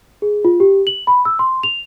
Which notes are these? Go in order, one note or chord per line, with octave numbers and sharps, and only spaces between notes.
G#4
F4
G4
F#7
B5
E6
C6
F7